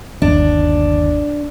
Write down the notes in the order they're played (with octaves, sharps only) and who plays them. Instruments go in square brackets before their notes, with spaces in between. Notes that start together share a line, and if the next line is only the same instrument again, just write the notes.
[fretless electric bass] G1 D#2 [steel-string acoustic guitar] D4